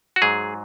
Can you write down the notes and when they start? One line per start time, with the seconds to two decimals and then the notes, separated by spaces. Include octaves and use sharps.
0.16 F#4
0.22 G#2 F#3 G#4